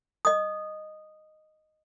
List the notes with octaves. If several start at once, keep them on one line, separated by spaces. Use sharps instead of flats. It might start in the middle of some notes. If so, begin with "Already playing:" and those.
D#5 D#6